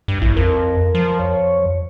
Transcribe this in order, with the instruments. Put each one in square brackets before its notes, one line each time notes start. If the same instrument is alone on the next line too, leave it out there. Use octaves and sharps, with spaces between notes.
[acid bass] G2
[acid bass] A#1 [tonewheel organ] E4
[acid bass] F2 [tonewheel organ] A#4
[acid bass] F3
[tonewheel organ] F2 C#5